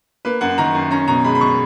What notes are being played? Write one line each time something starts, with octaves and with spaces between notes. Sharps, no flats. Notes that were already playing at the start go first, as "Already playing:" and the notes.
A#3 B4
F#2 F#5
D#3 A#5
F#2
C#4 A#5
B2 A#5
G#3 B5
B5
B2 C#6